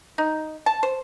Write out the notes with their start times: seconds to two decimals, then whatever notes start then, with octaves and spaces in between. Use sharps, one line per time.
0.18 D#4
0.66 A5
0.83 C5